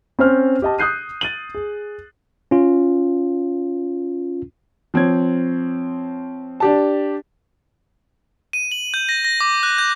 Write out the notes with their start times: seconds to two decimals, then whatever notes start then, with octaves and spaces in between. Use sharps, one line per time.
0.19 C4 C#4 C5 F6
0.62 G4 D#5 A5
0.79 D#6 F#6 G6 C7 D#7
1.21 A6 D#7 F#7
1.55 G#4
2.51 C#4 F4
4.94 F3 C4 C#5 G#6
6.60 D4 G4 A5
8.53 D#7
8.71 F#7
8.94 G6
9.09 A#6
9.24 A#6
9.41 D6
9.63 F#6
9.78 G6